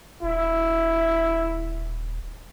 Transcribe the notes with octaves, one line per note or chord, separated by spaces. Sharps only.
D#1 E4